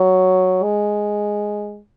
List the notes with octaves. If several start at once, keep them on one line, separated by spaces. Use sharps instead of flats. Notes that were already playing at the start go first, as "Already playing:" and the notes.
Already playing: F#3
G#3